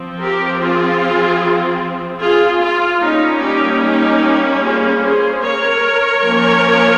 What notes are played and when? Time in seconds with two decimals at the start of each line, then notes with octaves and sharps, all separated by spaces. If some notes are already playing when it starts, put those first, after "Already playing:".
Already playing: F3 C4
0.21 G4 A#4
0.61 F4 G#4
2.21 F4 G#4
2.61 F4
3.01 G3 A#3 C#4 D#4
3.41 D#4 G4
3.81 D#4 G4
4.61 F4 G#4
5.02 G#4 C5
5.42 A#4 C#5
6.22 F3 A#3 C#4